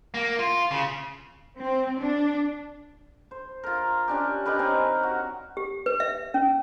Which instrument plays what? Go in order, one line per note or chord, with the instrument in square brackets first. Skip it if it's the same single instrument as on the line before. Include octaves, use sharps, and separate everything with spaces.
[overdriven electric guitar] A#3
F4
C#3
[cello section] C4
D4
[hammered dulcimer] C5
F4 A#4
C#4 D4 G4
D#4 G4 A#4 B4
C4 C#4
F#4
[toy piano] G4
B4
E5
C#4